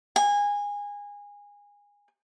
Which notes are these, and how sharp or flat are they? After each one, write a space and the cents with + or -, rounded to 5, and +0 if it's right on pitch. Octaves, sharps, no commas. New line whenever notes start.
G#5 -25